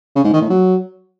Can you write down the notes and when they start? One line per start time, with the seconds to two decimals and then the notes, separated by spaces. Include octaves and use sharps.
0.16 C#3
0.24 G#2
0.33 D#3
0.42 A2
0.50 F#3